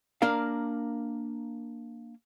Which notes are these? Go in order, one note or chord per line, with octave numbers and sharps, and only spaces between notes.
A#3 D4 A#4 F5